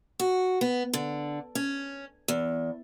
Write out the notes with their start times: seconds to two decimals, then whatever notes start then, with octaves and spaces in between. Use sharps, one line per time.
0.19 F#4
0.61 B3
0.93 D3
1.55 C#4
2.28 E2